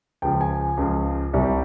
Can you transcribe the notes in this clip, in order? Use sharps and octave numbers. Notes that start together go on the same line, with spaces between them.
C#2 C#3 F3 G5
G#5
C#2 C#3 F3
C2 C3 G3